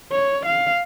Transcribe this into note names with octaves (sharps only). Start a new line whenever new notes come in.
C#5
F5